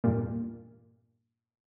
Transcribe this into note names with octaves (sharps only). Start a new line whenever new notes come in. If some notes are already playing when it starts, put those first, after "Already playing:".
E2 G2 A#2